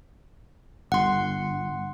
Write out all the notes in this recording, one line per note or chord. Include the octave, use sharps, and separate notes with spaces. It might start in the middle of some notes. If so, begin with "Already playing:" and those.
G1 F#5 C6